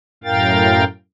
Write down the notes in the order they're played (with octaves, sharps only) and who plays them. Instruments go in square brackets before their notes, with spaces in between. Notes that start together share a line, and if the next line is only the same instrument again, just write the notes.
[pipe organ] F#2 A2 A#4 F5 G5 A6